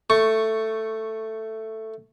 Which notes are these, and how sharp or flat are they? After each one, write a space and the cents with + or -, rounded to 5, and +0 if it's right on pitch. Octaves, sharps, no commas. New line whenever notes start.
A3 +5 C#6 +0